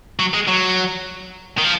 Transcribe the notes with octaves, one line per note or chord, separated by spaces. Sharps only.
F#3
G#3
F#3
D#3
F3